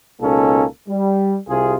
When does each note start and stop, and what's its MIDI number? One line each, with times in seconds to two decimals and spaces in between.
0.21 0.64 37
0.21 0.64 47
0.21 0.64 58
0.21 0.64 61
0.21 0.64 63
0.21 0.64 69
0.88 1.36 55
1.49 1.75 36
1.49 1.75 48
1.49 1.75 65
1.49 1.75 68